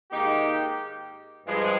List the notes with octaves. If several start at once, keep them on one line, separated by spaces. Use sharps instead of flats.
G#2 D#3 A#3 D#4 G4
G2 F3 G#3